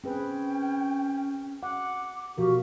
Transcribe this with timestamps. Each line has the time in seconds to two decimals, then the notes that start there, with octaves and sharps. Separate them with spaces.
0.04 C4 C#4 G#4 B4 G5
1.63 F#5 D6
2.38 B2 F3 F#4 G4 A#4 F5